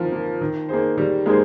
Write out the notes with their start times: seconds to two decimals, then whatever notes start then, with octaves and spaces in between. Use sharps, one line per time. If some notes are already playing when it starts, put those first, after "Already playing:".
Already playing: D#3 F3 A#3 C4 F4
0.12 A#3 F4
0.41 D#3
0.69 A#3 D#4 G#4 C5
0.98 D#3 G3
1.26 G#3 A#3 D#4 G#4 C5